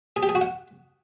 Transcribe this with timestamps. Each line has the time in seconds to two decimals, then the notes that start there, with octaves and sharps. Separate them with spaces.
0.16 G#4
0.23 G4
0.29 G#4
0.35 F#4
0.41 F#5